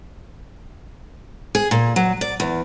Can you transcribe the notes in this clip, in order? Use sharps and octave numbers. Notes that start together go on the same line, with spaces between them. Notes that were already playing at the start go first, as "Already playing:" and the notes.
G#4
A#2
F#3
D5
E2